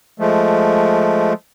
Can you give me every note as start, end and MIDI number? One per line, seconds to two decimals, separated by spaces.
0.20 1.33 53
0.20 1.33 56
0.20 1.33 57